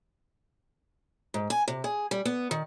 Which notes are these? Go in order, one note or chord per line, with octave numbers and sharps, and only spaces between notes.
G#2
G#5
C3
G#4
G3
B3
D#3